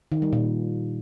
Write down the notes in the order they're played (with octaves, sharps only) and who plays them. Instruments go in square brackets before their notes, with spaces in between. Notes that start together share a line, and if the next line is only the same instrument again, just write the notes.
[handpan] D#3
G3
A#2